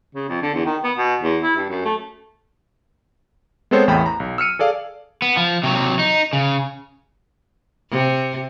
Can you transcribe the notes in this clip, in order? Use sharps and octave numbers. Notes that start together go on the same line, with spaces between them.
C#3
F2
D3
E2
D#3
B3
B2
E2
E4
G2
F#2
A3
G#3 B3 C4 A4 C5 C#5
A1 E2 A3 G5 B5
A#5
B1
E6 F6 C#7 D#7
G#4 A4 D5 F5
B3
F3
C3 F#3
D#4
C#3
C3